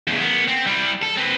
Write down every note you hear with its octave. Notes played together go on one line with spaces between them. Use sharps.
E2 C#3
B3 A#4
C4
G3 E4
A4
C4 B4